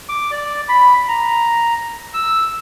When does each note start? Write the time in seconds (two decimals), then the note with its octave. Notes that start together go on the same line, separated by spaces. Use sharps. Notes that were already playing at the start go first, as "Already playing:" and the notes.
0.09 D6
0.31 D5
0.69 B5
1.08 A#5
2.14 E6